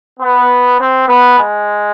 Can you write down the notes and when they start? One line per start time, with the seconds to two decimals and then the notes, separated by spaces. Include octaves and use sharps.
0.20 B3
0.78 C4
1.08 B3
1.38 G#3